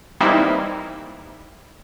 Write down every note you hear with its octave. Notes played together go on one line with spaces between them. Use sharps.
E3 G3 A#3 C4 D#4 E4